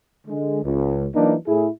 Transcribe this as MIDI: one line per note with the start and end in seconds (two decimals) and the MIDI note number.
0.27 0.61 50
0.27 0.61 56
0.63 1.06 37
1.15 1.35 52
1.15 1.35 54
1.15 1.35 58
1.15 1.35 62
1.15 1.35 63
1.47 1.67 45
1.47 1.67 64
1.47 1.67 68